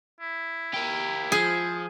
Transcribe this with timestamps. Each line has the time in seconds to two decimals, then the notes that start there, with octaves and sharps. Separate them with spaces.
0.20 E4
0.74 G4 A#4
1.32 F3 G#4